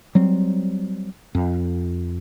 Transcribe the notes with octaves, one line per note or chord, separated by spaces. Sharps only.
F#3 G3 C4
F2